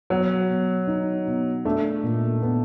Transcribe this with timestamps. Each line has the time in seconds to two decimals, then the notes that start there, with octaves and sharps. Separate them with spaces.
0.10 B2 F#3
0.50 B2
0.87 D#4
1.27 B2
1.65 A3 D4
2.03 A#2
2.43 B3